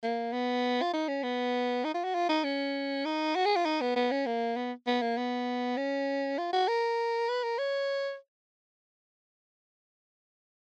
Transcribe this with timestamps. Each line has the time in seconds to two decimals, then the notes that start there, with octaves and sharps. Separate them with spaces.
0.03 A#3
0.33 B3
0.82 F4
0.93 D#4
1.08 C#4
1.23 B3
1.84 D#4
1.94 F4
2.04 F#4
2.15 F4
2.29 D#4
2.44 C#4
3.05 D#4
3.36 F#4
3.45 G#4
3.56 F4
3.65 D#4
3.81 B3
3.96 B3
4.11 C#4
4.26 A#3
4.56 B3
4.87 B3
5.02 A#3
5.17 B3
5.77 C#4
6.38 F4
6.53 F#4
6.68 A#4
7.29 B4
7.43 A#4
7.58 C#5